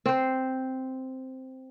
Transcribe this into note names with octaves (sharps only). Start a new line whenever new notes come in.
C4 C5